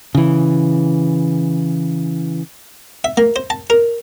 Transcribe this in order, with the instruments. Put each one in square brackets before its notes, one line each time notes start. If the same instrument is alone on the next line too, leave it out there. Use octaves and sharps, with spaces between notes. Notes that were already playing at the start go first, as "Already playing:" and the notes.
[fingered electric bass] C#3 E3
[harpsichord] E5
A#3
C5
A5
A#4